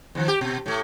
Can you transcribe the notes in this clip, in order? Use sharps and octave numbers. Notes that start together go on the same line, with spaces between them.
E2 D#3 F3
G4
B2
A2 A3